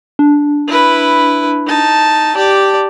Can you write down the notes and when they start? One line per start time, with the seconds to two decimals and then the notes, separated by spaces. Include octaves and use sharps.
0.19 D4
0.68 E4 B4
1.66 D#4 A5
2.35 G4 D5 A5